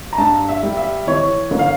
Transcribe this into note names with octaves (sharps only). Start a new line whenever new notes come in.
A#5
G2 A5
E5
G3
E5
E3 C#5
G1
F5